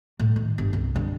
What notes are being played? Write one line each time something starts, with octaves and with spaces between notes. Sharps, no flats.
A2
D#3
G1
C2
G2 D3